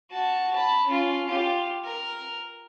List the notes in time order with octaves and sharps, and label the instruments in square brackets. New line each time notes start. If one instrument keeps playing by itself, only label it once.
[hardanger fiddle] F#4 A5
A5 B5
C#4 F4
F4 G4
A#4